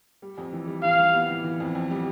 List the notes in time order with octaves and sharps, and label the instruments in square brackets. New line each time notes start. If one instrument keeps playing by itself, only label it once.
[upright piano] G3
F2
E3
G3
[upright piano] E3 [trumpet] F5
[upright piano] G3
B3
E3
E3
F2
F2
G3